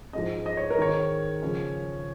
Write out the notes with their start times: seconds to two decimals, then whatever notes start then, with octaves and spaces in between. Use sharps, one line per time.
0.13 G#2 F3 G#3 C#4 D#5
0.46 D#5
0.57 C#5
0.70 A#4
0.78 G#2 D#3 G#3 D#4 C#5
1.43 C#3 F3 G#3 C#4